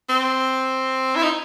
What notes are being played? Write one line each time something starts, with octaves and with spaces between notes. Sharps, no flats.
C4
E4
D#4